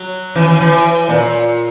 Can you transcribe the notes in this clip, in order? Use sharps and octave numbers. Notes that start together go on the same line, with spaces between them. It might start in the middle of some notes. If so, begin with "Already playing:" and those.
Already playing: F#3
E3
E3
E3
A#2